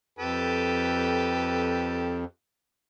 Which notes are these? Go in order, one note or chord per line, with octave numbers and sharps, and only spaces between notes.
F2 G4 A4 B4